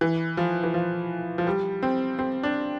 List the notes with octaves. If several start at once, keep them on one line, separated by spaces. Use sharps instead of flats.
E3
F3
E3
F3
F3
G3
C4
C4
D4